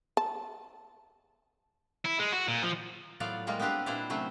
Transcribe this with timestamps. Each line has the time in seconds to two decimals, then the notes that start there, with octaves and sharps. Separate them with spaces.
0.17 A5
2.05 E4
2.20 G#3
2.32 F#4
2.48 A#2
2.63 F3
3.20 A2 F#3 B3 F4 D5 F5
3.47 G3 G#3 A#3 F4 A#4
3.59 B3 C4 D4 G4 B4 F5
3.86 A#2 D4 E4 C5 D5 F5
4.10 C3 F#3 A3 C4 C#4 C5